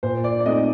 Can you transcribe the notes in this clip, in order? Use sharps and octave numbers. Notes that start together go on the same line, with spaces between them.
A#2 C5
D5
D5
A3 C4 D#4 D#5